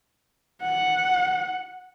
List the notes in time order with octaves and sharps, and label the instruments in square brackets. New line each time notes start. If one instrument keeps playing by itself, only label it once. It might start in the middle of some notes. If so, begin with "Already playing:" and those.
[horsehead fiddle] F#5